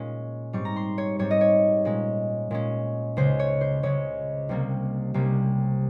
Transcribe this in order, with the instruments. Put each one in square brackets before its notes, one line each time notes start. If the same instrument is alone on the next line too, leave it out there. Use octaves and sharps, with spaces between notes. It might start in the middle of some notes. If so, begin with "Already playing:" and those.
Already playing: [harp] A#2 G#3 C#4
G#2 G3 C4 C#6
A#5
C6
C#5
G#2 G3 C4 C#5
D#5
C#5
A#2 G#3 C#4
A#2 G#3 C#4
C#2 C#3 G#3 C#4 C5
C#5
C5
C#2 C#3 G#3 C#4 C#5
C2 C3 G3 A#3 C#4
C2 C3 G3 A#3 C#4